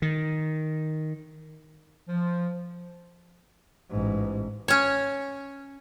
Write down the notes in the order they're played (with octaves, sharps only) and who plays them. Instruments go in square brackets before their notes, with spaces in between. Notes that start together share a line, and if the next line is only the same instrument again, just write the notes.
[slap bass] D#3
[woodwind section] F3
[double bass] A1 G#2
[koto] C#4 C#5